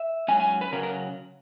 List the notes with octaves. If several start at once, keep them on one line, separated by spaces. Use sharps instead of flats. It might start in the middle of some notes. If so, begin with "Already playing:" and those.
Already playing: E5
G#2 F#3 C#4 G#5
G#5
B4
C#3 F#3 C#4 A#4
A#4